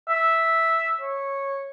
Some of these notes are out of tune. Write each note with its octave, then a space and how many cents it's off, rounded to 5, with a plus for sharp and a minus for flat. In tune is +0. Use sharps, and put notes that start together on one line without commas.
E5 -5
C#5 -10